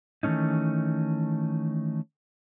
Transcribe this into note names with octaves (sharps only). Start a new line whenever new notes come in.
D#3 E3 A3 C#4 D#4